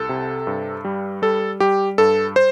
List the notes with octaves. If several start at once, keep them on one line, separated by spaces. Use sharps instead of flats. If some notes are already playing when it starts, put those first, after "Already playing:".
Already playing: C2 A4
C3
G2
G3
G3 A4
G3 G4
G2 A4
C5